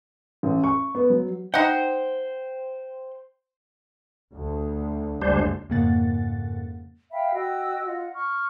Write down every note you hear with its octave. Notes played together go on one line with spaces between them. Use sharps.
A1
C#6
B3
F#3
D#4 C5 F#5 G5
D2
F#1 D2 G3 G#3 D4 C5
F2 G#2 C#3 A#3 F#5 A6
E5 F5 G5 B5
F#4 D#5 G5 E6
F4 D#5 F#5
C#6 F6